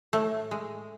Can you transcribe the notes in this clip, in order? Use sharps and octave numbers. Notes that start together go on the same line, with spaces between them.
A2 A3
G#3